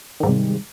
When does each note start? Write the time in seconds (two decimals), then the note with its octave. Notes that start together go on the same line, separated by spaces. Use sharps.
0.20 D#3
0.23 G#2
0.26 G3
0.29 C3